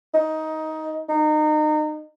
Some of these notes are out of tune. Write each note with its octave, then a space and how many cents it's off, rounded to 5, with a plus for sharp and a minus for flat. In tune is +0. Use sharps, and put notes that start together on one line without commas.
D#4 +15
D#4 -30